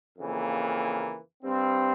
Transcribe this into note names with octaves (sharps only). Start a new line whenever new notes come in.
F2 C#3 E3 A#3
G2 G3 C4